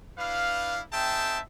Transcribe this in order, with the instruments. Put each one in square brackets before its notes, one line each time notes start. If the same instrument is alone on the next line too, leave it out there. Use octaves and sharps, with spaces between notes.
[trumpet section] D4 E4 B4 F5
C4 D#4 G#4 E5 G5 A5